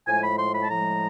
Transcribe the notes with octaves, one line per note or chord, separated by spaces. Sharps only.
A2 F3 G#3 G#5
B5
C6
B5
A5
A2 F3 G#3 A#5